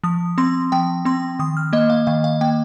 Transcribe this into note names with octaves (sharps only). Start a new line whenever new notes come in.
F3 D#6
C4 C6
F3 G5
C4 C6
D#3 D#6
F6
A#3 D#5
F5
D#3 F5
F5
A#3 G5